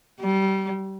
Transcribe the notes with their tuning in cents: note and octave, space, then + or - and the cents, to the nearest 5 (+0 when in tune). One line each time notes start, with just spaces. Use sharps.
G3 -25